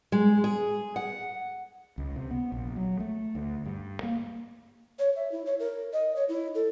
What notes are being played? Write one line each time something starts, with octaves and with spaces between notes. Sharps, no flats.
G#3
G#4
F#5
C#2
C3
B3
A#1
F#3
A3
D2
G2
A#3
C#5
E5
E4
C#5
A#4
D#5
C#5
E4
A4